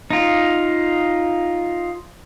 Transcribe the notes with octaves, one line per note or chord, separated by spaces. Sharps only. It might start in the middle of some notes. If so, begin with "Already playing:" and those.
D#4 F4